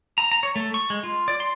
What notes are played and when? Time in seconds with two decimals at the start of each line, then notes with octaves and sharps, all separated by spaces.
0.18 A#5
0.32 A#5
0.43 C#5
0.56 A3
0.74 C#6
0.90 G#3
1.03 F4
1.28 D5
1.40 C6